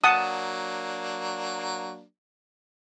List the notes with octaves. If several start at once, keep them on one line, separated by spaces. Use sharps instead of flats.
F#3 A#3 D4 F#5 A5 D#6